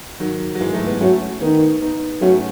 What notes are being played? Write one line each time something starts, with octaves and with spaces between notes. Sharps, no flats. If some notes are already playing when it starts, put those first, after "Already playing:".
D#3 F#3
F#3
E3 G#3
F#3 A3
G#3 B3
F#3 A3 C#4
D#3 B3 D#4
B3 D#4
F#3 A3 C#4